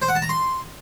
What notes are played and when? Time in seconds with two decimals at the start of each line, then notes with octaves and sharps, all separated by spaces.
0.02 C5
0.09 F#5
0.15 A5
0.22 A#5
0.29 C6